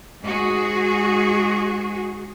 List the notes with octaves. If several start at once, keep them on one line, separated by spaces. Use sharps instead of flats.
G#2 F#4 G#4